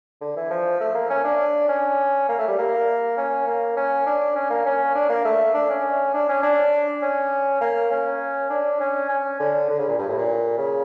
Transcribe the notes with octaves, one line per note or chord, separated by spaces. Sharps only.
D3
E3
F3
A3
A#3
C#4
D4
C#4
A#3
A3
G3
A#3
C#4
A#3
C#4
D4
C#4
A#3
C#4
D4
A#3
A3
D4
C#4
D4
C#4
D4
C#4
A#3
C#4
D4
C#4
C#4
D3
D3
C#3
A#2
G2
A2
A#2
C#3